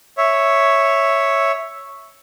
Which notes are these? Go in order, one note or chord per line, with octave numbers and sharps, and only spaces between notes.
C#5 E5